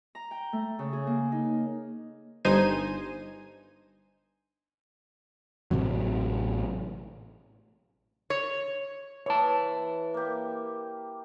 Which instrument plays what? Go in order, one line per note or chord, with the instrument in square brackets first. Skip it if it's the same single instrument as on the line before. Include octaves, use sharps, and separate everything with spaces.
[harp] A#5
G5
A3
C#3
G#4
A#3
D#4
[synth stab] G1 G2 D#4 C5 G#5 D#7
[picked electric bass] A1 A2 C3 F#3
[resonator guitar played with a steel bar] C#5
[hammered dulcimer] E3 [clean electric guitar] C#5 A5
[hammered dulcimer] A#3 G4